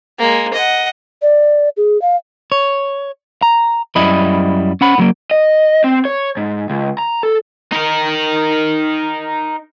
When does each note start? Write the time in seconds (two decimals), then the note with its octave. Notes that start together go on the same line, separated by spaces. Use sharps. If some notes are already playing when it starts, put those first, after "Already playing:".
0.19 G#3 A#3
0.54 D#5 F#5
1.22 D5
1.77 G#4
2.02 F5
2.52 C#5
3.42 A#5
3.96 F#2 G3 E4 D#5 B5
4.81 C#4 F#5 B5
4.98 A2 F#3 A#3
5.31 D#5
5.84 C4
6.05 C#5
6.37 G#2
6.70 C#2
6.99 A#5
7.23 A4
7.72 D#4 A#4